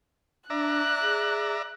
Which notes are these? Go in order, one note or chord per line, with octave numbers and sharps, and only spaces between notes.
D4 D5 E5 A#5 F#6
G#4